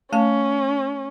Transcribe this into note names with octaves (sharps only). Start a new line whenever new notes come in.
A3 C#4 A5